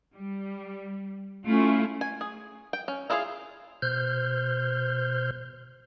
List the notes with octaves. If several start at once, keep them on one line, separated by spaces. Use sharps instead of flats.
G3
A3 C#4 E4 F4
G#5
G#4
G5
C#4
E4 F4 G#4 C#5 F5
B2 C5 F6 G6